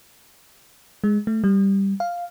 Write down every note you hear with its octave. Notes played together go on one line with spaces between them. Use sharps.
G#3
A3
G3
F5